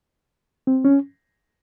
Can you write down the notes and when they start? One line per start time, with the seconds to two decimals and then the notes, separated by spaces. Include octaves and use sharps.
0.67 C4
0.85 C#4